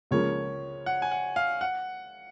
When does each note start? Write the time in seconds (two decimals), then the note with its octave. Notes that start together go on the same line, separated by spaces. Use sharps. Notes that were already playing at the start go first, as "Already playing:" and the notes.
0.11 C#2 C#3 F3 A#3 C#5
0.86 F#5
1.02 G#5
1.11 F#5
1.36 F5
1.61 F#5